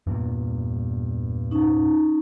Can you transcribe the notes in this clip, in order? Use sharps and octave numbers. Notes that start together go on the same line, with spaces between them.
E2 G2 A#2
C#4 D#4